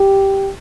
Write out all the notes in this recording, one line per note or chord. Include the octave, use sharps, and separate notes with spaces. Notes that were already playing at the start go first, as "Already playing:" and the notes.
Already playing: G4